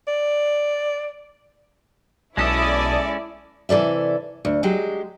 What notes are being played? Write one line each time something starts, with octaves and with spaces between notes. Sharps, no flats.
D5
B1 G#3 C#4 E4 A4 D5 A5 D#6
C3 E3 A4 D5 E5
D2
F#3 G#3 G4